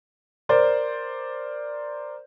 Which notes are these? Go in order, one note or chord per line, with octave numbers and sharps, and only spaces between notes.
A#4 C5 D5